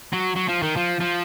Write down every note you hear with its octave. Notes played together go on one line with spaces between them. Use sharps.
F#3
F#3
F3
D#3
F3
F3